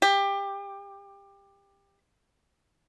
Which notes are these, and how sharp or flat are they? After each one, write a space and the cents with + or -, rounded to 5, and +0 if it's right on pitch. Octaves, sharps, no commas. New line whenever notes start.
G4 +20